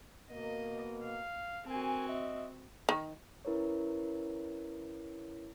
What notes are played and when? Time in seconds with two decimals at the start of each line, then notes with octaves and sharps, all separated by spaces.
0.31 B2 A#3 D#5
1.04 F5
1.67 D2 C4 F#4 A#4 G#5
2.08 D#5 E5
2.89 D#3
3.45 C#4 E4 A#4 B4 C#5